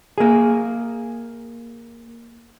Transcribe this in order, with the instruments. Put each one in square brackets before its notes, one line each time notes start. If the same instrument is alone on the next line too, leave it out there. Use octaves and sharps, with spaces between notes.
[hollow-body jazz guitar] A#3 G#4